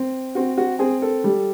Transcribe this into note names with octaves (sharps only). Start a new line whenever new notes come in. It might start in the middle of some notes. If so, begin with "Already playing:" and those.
Already playing: C4
C4 F#4
F#4
C4 G#4
A4
G3